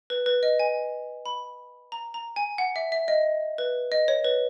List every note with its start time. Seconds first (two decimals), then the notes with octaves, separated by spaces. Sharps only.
0.10 B4
0.26 B4
0.43 D#5
0.59 G#5
1.26 B5
1.92 A#5
2.14 A#5
2.36 G#5
2.58 F#5
2.76 E5
2.92 E5
3.08 D#5
3.58 B4
3.92 D#5
4.08 C#5
4.24 B4